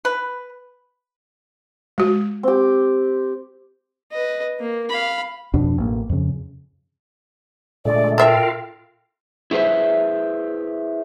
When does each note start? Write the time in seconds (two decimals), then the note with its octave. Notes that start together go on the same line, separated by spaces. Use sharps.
0.05 B4
1.98 G#3 F#4
2.43 C4 G4
4.12 B4 D#5
4.60 A#3
4.90 F5 B5
5.54 F2 B2 D4
5.78 A1 A#3
6.09 F2 C#3
7.85 A#2 D3 G#3 A3 D5
8.18 F4 A4 A#4 E5 F5 G5
9.51 E4 G#4 B4 C5 E5